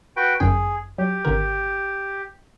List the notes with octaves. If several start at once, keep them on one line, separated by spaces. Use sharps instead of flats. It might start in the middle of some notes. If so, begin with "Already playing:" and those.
F#4 B4 G5
G1 F#2 G#4 G5
F#3 G4
G#1 D3 A#4